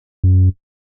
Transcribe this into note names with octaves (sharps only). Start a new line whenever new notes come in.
F#2